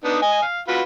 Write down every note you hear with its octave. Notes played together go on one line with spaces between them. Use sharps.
B3 D4 D#4
D#5 G#5
F5
F4 F#4 B4